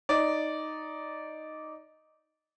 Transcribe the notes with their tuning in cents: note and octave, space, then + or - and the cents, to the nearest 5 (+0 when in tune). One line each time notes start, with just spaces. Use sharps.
D#4 +0 D5 -10